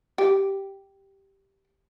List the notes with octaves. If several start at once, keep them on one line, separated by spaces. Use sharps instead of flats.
G4